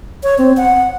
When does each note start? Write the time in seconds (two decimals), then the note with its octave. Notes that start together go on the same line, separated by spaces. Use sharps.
0.23 C#5
0.38 C4
0.57 F#5